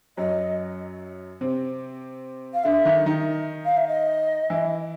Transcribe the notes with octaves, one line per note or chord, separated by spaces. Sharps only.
F#2 F#3 D#5
C3 C4
F5
D3 D4 E5
D#3 D#4
D#3 D#4
F5
E5
D#5
E3 E4